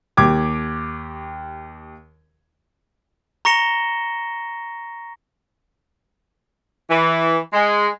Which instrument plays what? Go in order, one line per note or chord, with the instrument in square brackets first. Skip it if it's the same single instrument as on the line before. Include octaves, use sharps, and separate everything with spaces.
[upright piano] D#2 G4 D6 G#6
[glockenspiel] A#5 C#6 A#6 C#7 E7 G7
[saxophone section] E3
G#3